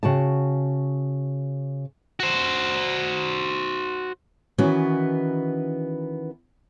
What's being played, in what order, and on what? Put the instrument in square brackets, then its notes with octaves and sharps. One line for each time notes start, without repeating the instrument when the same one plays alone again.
[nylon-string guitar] C#3 F#4 G5 A5
[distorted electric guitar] F#4 C5
[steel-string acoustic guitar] D#3 E3 B3 C#4 F#4 B4